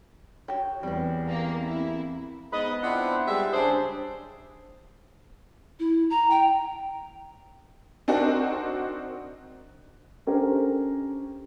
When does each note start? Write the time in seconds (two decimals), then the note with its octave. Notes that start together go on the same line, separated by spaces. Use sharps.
0.48 F#4 G4 C#5
0.83 E2 G3 C4 B4
1.28 A#3
1.62 E4
2.52 G#2 B3 B4 D#5
2.83 B3 C4 D4 E4 F4 F#5
3.27 G3 G#3 E5
3.52 C#3 D4 G#4 C5
5.80 E4
6.10 A#5
6.30 G5
8.08 C4 D4 D#4 F#4 A#4
10.27 C#4 D4 G4 A4 A#4 C5